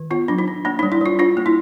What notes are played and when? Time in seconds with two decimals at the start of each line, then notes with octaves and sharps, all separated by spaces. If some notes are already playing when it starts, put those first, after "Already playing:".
Already playing: D#3
0.11 B3 F4
0.28 F#3 D4
0.38 D#4
0.48 D4
0.65 A#3 D4
0.79 D#4
0.83 G3
0.92 E4
1.01 G3 F4
1.19 D4 F4
1.37 A#3
1.46 E4